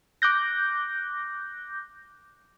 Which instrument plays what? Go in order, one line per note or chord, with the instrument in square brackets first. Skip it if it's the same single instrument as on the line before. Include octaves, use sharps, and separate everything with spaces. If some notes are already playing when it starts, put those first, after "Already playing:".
[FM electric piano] D6 F#6 G6 A#6